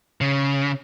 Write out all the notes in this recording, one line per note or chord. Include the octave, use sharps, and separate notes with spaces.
C#3